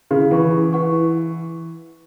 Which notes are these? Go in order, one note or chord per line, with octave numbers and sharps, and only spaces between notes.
C#3 E4
E3 B4 F#5 C#6
E4
B4 F#5 C#6
E4